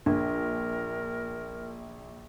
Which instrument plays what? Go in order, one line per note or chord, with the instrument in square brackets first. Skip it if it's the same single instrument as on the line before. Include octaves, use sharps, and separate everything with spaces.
[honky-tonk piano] A#1 [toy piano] D4 [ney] A#4